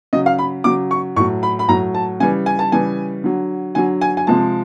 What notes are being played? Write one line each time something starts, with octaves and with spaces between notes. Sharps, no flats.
C#3 F#3 D#5
F5
B5
C#3 F#3 D6
C#6
A2 F#3 C#6
B5
B5
A2 F#3 A#5
A5
C#3 E3 G3 G#5
G#5
A5
C#3 E3 G3 G#5
D3 F#3
D3 F#3 G#5
G#5
G#5
C3 F3 G#3 A5